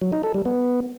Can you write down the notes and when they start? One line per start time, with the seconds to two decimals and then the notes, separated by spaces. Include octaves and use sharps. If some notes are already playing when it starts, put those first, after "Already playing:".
0.01 F#3
0.12 D#4
0.23 A4
0.34 G3
0.45 B3